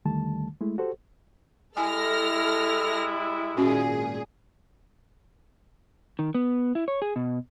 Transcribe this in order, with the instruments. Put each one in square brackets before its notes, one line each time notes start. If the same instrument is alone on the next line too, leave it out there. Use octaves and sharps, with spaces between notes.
[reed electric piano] D#2 D3 D#3 G3 A3 A5
G#3 A3 E4
F#4 G4 A4 C5
[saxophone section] G3 G#3 E4 [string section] A4 F6 A#6 [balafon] G#5
[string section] G#1 A#2 G#4 [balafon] C#4 F#4
[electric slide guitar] D#3
B3
E4
C#5
G#4
B2